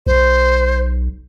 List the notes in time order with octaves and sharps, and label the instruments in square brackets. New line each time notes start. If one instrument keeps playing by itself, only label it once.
[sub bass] B1 [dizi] C5